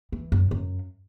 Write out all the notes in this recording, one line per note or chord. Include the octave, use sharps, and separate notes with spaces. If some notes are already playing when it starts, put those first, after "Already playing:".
E3
F#2
F#2